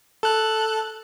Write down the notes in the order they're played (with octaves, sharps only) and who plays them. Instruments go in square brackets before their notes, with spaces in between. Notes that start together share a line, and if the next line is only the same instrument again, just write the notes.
[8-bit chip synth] A4 F#6